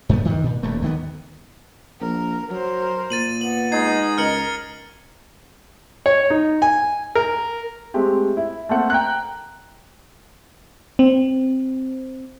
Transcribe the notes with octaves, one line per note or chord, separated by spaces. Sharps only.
G2 A3 B3
G2 D#3
A#2
D#1 D#2 A3
D2 D#3 A#3 B3
A#1 A#4
F#3 A#4 C5
A#2 A6 D#7 F#7
B3 F#7
G#3 D#4 G#6 C7
C#2 A#4 F6 C#7 F#7
C#5
D#4
G#5
A#4
G#3 A3 C4 G4
E4
A3 A#3 C4 A4 F#5
G5 A#5 F#6
C4